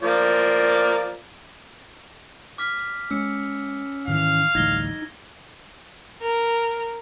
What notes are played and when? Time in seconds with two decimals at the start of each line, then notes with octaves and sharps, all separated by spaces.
0.03 F3 A#3 D5
2.58 D6 F6 B6
3.11 G#3 C#4 E6 C#7
4.07 G#2 D#3 E3 F5
4.55 A1 D2 G3 D#4 G#6 A#6 G7
6.21 A#4